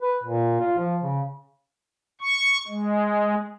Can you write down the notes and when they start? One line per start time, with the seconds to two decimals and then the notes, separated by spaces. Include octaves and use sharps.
0.02 B4
0.24 A#2
0.60 F4
0.78 F3
1.01 C#3
2.21 C#6
2.68 G#3